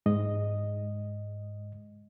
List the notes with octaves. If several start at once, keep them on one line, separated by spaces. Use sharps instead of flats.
G#2 G#3 D#5